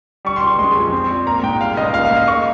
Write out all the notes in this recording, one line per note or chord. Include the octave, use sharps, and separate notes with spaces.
G3 C#6
C6
C#2 C#6
G#3 C6
F2
C4
A#2
A#3 A#5
G#2 G5
G3 F5
C#2 D#5
A#3 F5
F5
G#2
D#5
A#3 C#6